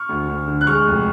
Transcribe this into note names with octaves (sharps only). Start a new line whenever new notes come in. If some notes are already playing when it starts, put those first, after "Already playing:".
Already playing: C#6 F6
D2
D2
D3
F#6
G#3 C#6 F6
F1